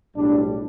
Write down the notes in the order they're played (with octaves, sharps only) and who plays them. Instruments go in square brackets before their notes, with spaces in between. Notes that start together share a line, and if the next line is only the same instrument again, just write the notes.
[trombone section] B1 A2 G3 D4